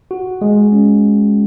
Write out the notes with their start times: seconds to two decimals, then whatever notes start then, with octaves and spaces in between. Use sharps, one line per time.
0.11 F#4
0.41 G#3
0.72 C#4